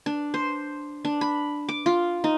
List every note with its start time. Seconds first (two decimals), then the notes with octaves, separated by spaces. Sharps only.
0.06 D4
0.34 C5
1.05 D4
1.21 B5
1.69 D6
1.86 F4
2.24 D#4